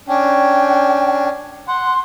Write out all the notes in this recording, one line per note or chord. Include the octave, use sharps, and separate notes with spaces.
C#4 D4 G5
F#5 C6